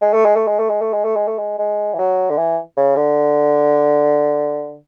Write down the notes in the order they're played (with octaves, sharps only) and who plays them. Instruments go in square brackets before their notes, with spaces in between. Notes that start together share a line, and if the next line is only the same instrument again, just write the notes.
[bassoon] G#3
A3
G#3
A3
G#3
A3
G#3
A3
G#3
A3
G#3
A3
G#3
G#3
E3
F#3
D3
E3
C#3
D3